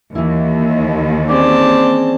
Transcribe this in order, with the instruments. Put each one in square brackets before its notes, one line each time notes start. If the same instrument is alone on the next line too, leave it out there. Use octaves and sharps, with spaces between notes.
[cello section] D#2 [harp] E3 E4
[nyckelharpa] C4 A5 [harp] C#4 G#4 [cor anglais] D5